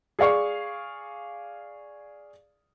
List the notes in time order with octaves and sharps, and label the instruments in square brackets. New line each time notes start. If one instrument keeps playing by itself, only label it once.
[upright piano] G#4 D5 F5 C#6